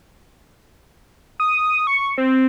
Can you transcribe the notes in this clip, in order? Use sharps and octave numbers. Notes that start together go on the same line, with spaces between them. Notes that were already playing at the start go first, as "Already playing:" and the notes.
D#6
C#6
C4